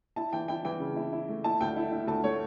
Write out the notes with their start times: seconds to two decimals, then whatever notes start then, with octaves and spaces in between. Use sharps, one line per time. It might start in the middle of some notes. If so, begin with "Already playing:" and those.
0.16 E4 A5
0.33 E3 G5
0.48 E4 G5
0.65 E3 G5
0.80 C#3
0.96 E4
1.12 E4
1.29 A3
1.44 E4 A5
1.61 D2 G5
1.77 E4
1.92 E4
2.07 D2 A5
2.23 A3 C#5